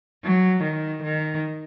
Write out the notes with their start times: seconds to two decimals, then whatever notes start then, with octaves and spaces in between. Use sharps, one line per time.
0.24 F#3
0.63 D#3
1.03 D#3